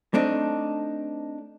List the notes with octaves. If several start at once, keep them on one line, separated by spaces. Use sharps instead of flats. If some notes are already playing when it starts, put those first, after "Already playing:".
A3 C4 D4 D#4